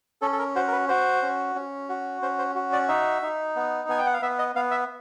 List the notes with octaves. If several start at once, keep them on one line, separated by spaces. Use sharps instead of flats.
C#4 A4
A4
A#4
F#4 C5
A#4
B4
F#4 C5
C#4
C#4
F#4
C#4 C5
C5
F#4
D5
D#4 E5
D#4
B3
B3 G#5
G5
F#5
F5
B3 E5
D#5
B3 F5
E5